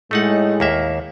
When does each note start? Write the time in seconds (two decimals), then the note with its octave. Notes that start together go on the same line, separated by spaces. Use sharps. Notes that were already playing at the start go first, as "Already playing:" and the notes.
0.11 A2 G#3 A3 D#4 F#5
0.60 D#2 A#3 E5